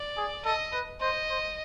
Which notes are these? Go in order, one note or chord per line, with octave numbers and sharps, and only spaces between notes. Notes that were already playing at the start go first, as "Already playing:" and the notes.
Already playing: D5
G#4
A4 D#5
B4
C5 D#5
C5